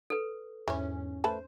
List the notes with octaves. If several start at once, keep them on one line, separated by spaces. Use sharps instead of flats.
A4 B4
E2 G#2 E3 C#4 C#5
A3 B4 C5 A5